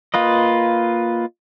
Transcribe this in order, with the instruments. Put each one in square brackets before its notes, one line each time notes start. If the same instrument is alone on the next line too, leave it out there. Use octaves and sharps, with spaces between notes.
[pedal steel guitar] A#3 F4 B4 D#5